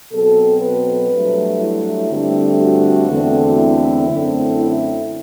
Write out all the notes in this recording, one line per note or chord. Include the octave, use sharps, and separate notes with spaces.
B2 F#3 C4 A4
B4
G2 F#3 A3
E4
G2 D3 A3 C4
F#4
E2 D3 A3 C4
E4
F#2 D3 A3 C4
E4